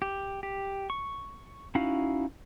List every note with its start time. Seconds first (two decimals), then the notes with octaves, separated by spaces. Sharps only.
0.02 G4
0.43 G4
0.90 C#6
1.75 C#4 D#4 E4 F#4 F5